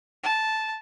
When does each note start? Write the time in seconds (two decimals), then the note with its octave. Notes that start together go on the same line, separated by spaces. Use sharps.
0.23 A5